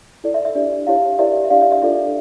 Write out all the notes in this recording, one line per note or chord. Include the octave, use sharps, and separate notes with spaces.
E4 A4 D5
E5
E5
D4 G4 D5
E4 G4 C#5 F5
E4 G4 A#4 D5 E5
E5
D4 G4 D5 F5
E5
E5
D4 F4 A4 D5 E5